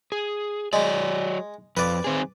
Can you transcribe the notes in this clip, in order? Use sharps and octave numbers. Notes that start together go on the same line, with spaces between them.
G#4
F#3 G#3 D5
F2 B4 D5
D#3 C4 G#4